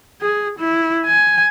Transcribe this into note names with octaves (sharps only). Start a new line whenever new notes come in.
G#4
E4
G#5